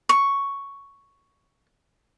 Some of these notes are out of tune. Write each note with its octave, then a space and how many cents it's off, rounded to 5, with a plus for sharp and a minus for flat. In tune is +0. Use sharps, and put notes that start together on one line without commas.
C#6 +5